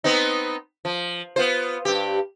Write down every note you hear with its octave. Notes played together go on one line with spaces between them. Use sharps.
B3 C4 D#4
F3
B3 F4 C5
G2 G4